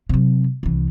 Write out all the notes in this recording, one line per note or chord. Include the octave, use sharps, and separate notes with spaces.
C3 F#3
C2 E3